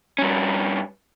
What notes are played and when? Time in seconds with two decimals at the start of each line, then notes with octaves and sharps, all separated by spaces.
0.19 G2 C#4